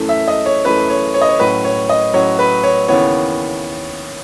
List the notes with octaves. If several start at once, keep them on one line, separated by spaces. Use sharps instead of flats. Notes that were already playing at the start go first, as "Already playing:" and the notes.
Already playing: F#2 E3 A3
E5
D#5
C#5
F#2 E3 A3 B4
C#5
C#5
D#5
C#5
A2 F#3 C#4 B4
C#5
D#5
A2 F#3 C#4 C#5
B4
C#5
D#2 C#3 E3 B3 C#5